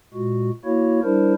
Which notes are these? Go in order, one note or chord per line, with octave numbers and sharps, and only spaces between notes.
A#2 G#3 F#4
A#3 E4 F#4 C#5
G3 D4 E4 A#4 C5